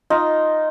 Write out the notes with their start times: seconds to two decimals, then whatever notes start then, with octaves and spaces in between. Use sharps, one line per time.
0.10 D#4 F4